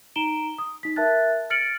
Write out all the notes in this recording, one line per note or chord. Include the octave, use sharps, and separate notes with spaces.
D#4 A#5 D7 E7 G7
D#6
D#4 B6
A#4 E5 A5 F#6 A6
F6 A6 C#7 D7 F#7